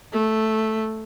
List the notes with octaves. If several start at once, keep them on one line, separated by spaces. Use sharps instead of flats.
A3